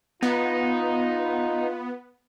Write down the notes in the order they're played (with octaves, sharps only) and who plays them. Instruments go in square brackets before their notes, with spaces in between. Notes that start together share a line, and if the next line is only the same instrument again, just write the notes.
[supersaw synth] B3 [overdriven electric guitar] D#4 [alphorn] F4